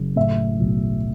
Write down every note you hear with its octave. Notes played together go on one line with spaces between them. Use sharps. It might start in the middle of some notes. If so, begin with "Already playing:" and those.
Already playing: F#1
A2 E5
B1